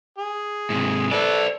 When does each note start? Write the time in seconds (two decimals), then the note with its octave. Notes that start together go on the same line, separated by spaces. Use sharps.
0.18 G#4
0.70 G#2 C3
1.11 A4 B4 C5 D5